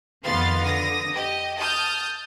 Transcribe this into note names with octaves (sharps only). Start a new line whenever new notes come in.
F2 D#3 B3 F5 C6 A6
D3 D#6 A#6
G4 D#5
A5 D#6 F6 G6